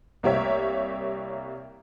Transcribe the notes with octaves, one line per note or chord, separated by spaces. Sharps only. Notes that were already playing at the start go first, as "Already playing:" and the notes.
C2 A#3 G4 C#5 E5